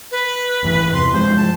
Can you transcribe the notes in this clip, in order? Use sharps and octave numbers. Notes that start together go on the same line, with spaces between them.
B4
A1 G2 E3
E2 C3 C6
G2 F3 G#3 C5
A5